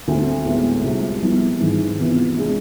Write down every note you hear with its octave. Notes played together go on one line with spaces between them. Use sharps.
D2 D3 A3 C4
A2 G#3 B3
C2 C3 G#3 C4 F4
C2 C3 F3 B3 E4
G#1 G#2 E3 G#3
C3 E3 B3 F4
C3 G#3 D4 G#4